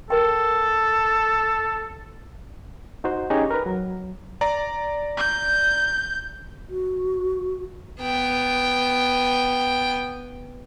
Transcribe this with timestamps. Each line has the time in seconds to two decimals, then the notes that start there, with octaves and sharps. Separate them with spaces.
0.10 A4 A#4 G5
3.04 D#4 F#4 C5
3.30 C#4 D#4 G4 G#4 C#5
3.51 A#4 B4
3.66 F#3
4.41 D5 A#5
5.17 G6
6.70 F#4
8.01 B3 G5